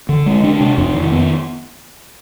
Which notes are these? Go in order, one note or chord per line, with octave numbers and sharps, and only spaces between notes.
D3
G#3
D4
C3
F2
D#3
B3